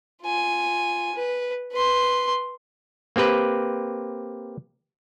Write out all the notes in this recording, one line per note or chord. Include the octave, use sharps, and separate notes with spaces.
F4 G#5
B4
B4 C6
A#3 C4 G4 B4